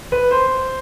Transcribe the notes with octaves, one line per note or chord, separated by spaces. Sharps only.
B4
C5